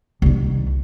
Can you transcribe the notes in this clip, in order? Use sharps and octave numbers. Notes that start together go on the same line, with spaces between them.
C2 D#3